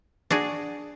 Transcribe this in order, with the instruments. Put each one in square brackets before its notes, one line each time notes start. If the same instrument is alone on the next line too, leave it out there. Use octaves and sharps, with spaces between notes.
[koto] D4 F#4 G#4